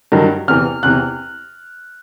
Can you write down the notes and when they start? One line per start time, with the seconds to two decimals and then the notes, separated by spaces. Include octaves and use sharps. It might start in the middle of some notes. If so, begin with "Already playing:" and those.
0.12 G2 D#3 F#3
0.48 E2 C3 E3 F6
0.83 E2 C3 E3 F#6